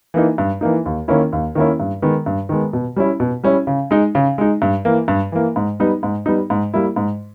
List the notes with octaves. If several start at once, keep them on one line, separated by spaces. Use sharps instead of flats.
E3 A#3 D#4
G2
E3 A#3 D#4
D#2
D#3 A#3 C#4 E4
D#2
D#3 A#3 C#4 E4
G2
D#3 G#3 B3
G2
D#3 G#3 B3
B2
G3 C#4 E4
B2
G3 C#4 E4
C#3
G#3 D#4
C#3
G#3 D#4
G2
E3 A#3
G2
E3 A#3
G#2
G3 B3 D#4
G#2
G3 B3 D#4
G#2
G3 A#3 E4
G#2